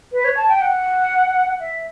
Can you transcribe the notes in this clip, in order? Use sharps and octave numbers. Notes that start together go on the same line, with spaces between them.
B4
C#5
A5
G5
F#5
E5